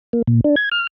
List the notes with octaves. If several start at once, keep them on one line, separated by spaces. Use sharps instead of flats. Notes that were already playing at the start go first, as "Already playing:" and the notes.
A#3
A#2
D4
G#6
F6